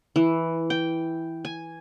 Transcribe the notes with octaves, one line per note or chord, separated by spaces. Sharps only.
E3
G5
G#5